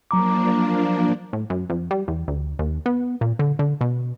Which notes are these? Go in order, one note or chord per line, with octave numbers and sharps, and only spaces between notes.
F3 F#3 A#3 D4 A#5 D6
A2
F#2
F2
G3
E2
D2
D#2
B3
A#2
D3
D3
B2